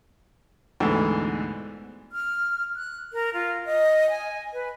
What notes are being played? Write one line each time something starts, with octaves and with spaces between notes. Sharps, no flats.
D2 G#2 B2 D3 E3
F6
F#6
A#4
F4
D#5
G#5
B4